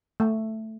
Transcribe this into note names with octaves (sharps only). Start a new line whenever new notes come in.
A3